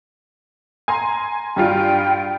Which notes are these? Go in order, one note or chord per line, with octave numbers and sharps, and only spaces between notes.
G#5 A#5 C6
G2 G3 F4 G5